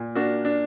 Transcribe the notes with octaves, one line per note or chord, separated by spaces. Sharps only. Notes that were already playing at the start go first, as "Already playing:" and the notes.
Already playing: A#2
A#3 D4 F#4
D4